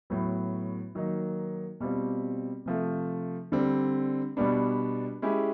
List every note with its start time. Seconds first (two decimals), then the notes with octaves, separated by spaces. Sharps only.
0.10 A2 F#3 B3
0.95 D#3 F#3 A#3 D#4
1.80 B2 G3 C4 F4
2.66 C3 F3 A3
3.52 D3 G3 C4
4.37 B2 G3 B3 D4
5.22 G#3 C#4 E4 G4